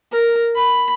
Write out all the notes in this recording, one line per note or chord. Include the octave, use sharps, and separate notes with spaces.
A#4
B5